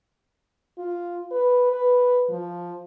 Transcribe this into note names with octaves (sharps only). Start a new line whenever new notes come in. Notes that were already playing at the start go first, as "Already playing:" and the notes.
F4
B4
B4
F3